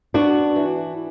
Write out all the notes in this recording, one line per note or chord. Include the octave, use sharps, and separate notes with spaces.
B3 D4 F#4
E3